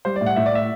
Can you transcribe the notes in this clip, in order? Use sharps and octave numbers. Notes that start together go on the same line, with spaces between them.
G3 C5
D5
A2
F#5
A2 E5
D5
E5